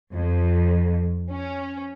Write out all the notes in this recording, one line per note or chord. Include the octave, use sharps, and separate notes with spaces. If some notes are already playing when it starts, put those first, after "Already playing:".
F2
C#4